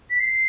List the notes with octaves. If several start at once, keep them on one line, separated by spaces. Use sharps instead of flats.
B6
C7